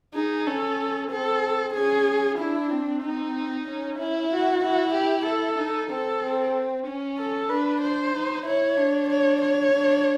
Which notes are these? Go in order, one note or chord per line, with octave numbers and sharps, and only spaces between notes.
D#4 G#4
C#4 A4
C4 A4
C#4 G#4
D4 E4
C4
D#4
C#4
E4
F#4
E4
G4
A4
D#4
C4 A4
C4
C#4
A4
D4 B4
C5
D#4
E4 C#5
D4
C#5
C#5
D4